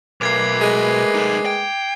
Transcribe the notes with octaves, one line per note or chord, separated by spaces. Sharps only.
B1 A3 A#3 B4 D6 G#6 C7
G#3
D#4 A4
G5